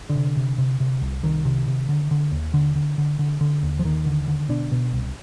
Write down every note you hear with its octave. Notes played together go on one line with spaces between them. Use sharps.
D3
C3
C3
C3
C3
C2
C2 D#3
C3
C3
D3
D3
D#2
D#2 D3
D3
D3
D3
D3
D#2
F3
D#2 D#3
D3
D3
B2 D4
B2
C2